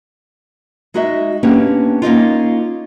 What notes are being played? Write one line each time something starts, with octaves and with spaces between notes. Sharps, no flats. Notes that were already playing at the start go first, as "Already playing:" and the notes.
G#3 D#4 F#4 D#5 E5
A#3 B3 C#4 D4 G4
A#3 C#4 D#4 F4